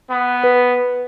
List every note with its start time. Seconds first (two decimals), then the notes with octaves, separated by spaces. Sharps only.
0.10 B3
0.44 B4